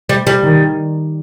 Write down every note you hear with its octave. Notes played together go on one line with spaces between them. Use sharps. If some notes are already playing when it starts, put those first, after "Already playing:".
G3
G3
D#3